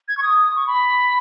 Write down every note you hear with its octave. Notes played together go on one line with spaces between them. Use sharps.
G#6
C#6
D#6
C#6
B5